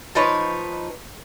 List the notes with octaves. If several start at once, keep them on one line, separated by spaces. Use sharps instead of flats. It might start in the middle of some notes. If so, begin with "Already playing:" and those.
F3 D#4 B4 C#5